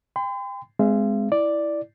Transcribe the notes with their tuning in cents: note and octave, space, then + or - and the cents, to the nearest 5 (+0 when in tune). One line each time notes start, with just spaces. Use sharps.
G5 +30 C6 -45
G#3 +5 C4 -30 F5 -45
E4 +0 D5 +0